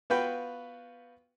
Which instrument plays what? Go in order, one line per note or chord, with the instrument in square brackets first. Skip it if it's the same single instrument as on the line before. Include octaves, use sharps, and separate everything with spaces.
[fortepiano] B3 F4 F#4 B4 G5 B5